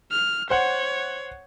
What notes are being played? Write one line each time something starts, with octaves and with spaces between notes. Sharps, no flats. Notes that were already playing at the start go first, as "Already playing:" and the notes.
F6
C5 C#5 F#5